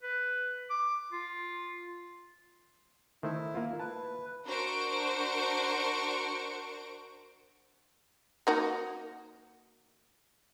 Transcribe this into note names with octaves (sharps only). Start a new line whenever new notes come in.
B4
D6
F4
D#3 A3 E4 C5
A#3 F4
B4 A5
D4 F#4 A#4 C5 C#6 D7
A#3 D#4 F#4